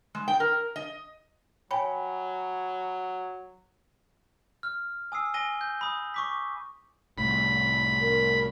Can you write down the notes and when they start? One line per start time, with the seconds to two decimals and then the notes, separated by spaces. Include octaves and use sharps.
0.15 G#3
0.28 G5
0.40 A#4
0.76 D#5
1.71 F#3 C#5 G5 G#5 B5
4.63 F6
5.12 G#5 D#6 E6 C7
5.34 G#5 A#6 D#7 G7
5.61 G6
5.81 B5 D#6
6.14 C#6 D6 B6
7.18 C2 A2 B5
8.01 A#4